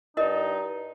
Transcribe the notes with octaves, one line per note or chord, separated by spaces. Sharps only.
G2 D#4 E4 A#4 D#5